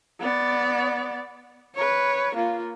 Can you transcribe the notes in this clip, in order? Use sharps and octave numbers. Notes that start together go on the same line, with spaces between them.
B3 D5
B4 C#5
A#3 F4